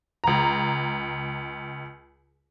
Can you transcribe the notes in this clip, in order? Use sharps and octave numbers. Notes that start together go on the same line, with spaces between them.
C#2 A#5